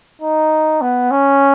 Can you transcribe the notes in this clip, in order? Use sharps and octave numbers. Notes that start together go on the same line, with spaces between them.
D#4
B3
C#4